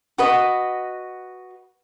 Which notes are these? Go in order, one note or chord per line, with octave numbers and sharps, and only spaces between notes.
F#4 B4 D#5